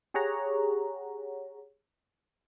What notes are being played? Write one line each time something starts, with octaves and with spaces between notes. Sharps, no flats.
G4 G#4 C#5 F#5 A#5